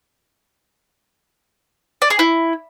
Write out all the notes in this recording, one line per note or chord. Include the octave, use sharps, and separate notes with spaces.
D5
G#4
E4